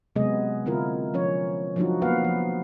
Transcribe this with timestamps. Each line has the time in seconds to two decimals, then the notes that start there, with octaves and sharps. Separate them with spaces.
0.16 C3 F#3 G#3 B3 G#4 D#5
0.66 D3 C4 E4 F4 A#4
1.14 F3 C#4 C#5
1.76 F3 F#3 D4 D#4 F4 F#4
2.02 A#3 B3 B4 F5 F#5
2.25 F3